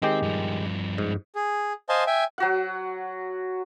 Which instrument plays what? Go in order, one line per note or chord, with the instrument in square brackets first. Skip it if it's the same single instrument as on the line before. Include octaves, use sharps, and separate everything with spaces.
[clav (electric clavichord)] D#3 G#3 G4 [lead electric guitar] C4
[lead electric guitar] G2 F3
[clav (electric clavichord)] G#2
[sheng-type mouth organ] G#4
C5 D#5 F5 G#5 A5 C6
E5 G5 G#5
[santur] F#3 F#4 F#5